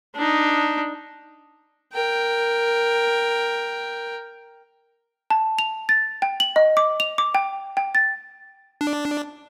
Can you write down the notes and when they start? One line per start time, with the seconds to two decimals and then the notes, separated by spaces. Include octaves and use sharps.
0.16 D4 D#4
1.93 A#4 G5
5.30 A5
5.59 F7
5.89 A6
6.22 G5
6.40 F#7
6.56 D#5
6.77 D6
7.00 F7
7.18 D6
7.35 G5
7.77 G5
7.95 A6
8.81 D4